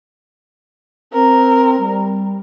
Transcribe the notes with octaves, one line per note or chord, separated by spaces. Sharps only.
C4 A#4
G3